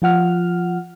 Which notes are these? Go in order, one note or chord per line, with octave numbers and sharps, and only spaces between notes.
F3 F4 F#5 F6